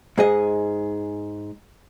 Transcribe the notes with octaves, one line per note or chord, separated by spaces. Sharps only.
G#2 G#4 D#5